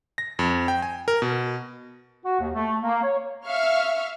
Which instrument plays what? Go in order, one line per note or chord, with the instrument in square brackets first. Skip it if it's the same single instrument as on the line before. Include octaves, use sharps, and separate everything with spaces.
[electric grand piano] A#6
F2
G5
G#5
A#4
B2
[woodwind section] F#4
D#2
A3
A#3
C#5
[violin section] E5 F5 C#6 F6